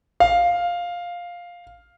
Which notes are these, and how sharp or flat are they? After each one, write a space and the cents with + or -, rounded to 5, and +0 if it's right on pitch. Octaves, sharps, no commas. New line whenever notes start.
F5 +5